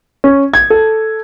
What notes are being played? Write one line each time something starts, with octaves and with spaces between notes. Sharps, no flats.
C#4
G#6
A4